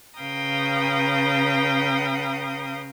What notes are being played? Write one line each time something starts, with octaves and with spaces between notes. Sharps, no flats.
C#3 B4 F5 G5 A#5 D#6